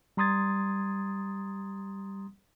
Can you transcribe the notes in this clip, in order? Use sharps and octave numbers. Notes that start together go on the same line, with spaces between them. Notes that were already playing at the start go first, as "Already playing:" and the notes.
G3 A#5 C6 D#6 G#6 A6